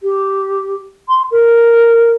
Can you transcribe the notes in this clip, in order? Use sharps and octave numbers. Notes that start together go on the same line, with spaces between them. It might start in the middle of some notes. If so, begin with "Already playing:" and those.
G4
C6
A#4